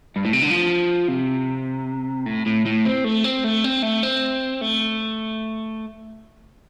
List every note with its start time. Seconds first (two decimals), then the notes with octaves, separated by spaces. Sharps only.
0.16 G2
0.25 A2
0.33 C3
0.42 D3
0.50 F3
1.08 C3
2.26 A2
2.46 A2
2.66 A2
2.85 C4
3.04 A3
3.24 C4
3.44 A3
3.64 C4
3.83 A3
4.03 C4
4.61 A3